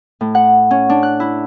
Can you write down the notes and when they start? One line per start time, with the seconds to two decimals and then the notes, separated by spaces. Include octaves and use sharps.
0.21 A2
0.35 F#5
0.71 C#4
0.90 D4
1.03 F#6
1.20 E4